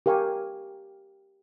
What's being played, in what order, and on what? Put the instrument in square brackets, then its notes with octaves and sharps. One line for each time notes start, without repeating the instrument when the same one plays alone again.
[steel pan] G4 A#4 F5 G#5 C#6